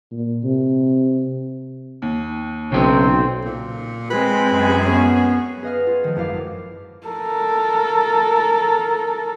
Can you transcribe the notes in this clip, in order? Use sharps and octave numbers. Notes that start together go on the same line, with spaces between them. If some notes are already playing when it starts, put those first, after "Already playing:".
A#2
C3
D#2
B1 C#3 C4 G5
A#2
G#3 C4 B4
F#2 G#4
B3 C#4
G#4 B4 D#5 F5 F#5 F6
F4
D#3 F3
G#1 F#2 E4 F5 D6
A4 A#4